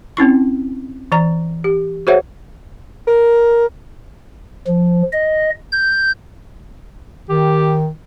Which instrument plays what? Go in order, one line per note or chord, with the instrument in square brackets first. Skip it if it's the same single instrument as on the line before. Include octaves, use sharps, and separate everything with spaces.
[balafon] C4 C#4 E4 C#6
E3 D5 A#5
G4
F#4 G#4 C5 C#5 E5 F#5
[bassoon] A#4
[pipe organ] F3
D#5
G6
[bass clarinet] D#3 [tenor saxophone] G4